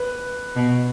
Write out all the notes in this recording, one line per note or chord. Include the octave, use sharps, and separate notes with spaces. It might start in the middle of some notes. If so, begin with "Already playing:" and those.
Already playing: B4
B2